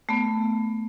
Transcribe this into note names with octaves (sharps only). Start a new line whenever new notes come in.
A3 B3